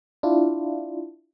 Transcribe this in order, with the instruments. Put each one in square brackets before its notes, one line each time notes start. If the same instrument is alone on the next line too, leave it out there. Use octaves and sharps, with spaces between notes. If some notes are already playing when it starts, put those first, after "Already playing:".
[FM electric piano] D4 E4 F4